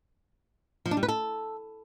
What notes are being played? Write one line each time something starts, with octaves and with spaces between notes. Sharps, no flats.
F3
D4
G3
B4
A4